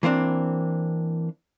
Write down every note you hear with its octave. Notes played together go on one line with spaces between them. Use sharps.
E3 A#3 C4 D4